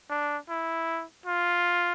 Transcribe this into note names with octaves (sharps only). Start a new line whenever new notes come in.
D4
E4
F4